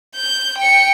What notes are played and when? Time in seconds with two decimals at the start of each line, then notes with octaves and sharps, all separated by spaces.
0.16 G6
0.58 G5 C#7